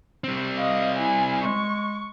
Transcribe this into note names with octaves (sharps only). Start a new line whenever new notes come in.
G3 C4
D#5 F5
E4 G#5
G#3 C#6